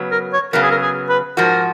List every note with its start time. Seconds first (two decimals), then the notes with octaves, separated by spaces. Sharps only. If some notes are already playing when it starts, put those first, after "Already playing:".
Already playing: C#3 F#3 B3
0.12 A#4
0.33 C#5
0.53 C#3 F#3 B3 A#4
0.63 G#4
0.71 A#4
0.82 G#4
1.09 B4
1.37 G#2 F3 F#4 A#4